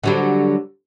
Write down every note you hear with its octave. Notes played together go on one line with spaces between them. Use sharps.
D3 F#3 G3